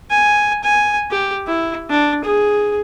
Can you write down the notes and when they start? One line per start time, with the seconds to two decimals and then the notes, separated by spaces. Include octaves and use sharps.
0.11 G#5
0.64 G#5
1.11 G4
1.47 E4
1.90 D4
2.24 G#4